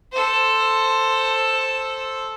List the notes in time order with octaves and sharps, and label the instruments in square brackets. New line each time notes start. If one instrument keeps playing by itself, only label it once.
[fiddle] A4 C5